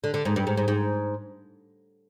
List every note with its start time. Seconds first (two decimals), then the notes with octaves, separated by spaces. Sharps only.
0.04 D3
0.14 D3
0.25 G#2
0.36 G2
0.47 G#2
0.57 G#2
0.68 G#2